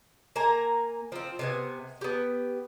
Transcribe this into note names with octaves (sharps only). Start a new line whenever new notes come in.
A#3 G#5 A#5
F3 C4
C3 B3 G#5
B3 G4